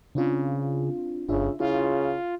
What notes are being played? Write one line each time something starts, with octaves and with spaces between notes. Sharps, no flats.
C#3 C4 D4 F4
G1 C#3 D4 F4 E5
C#3 E4 F4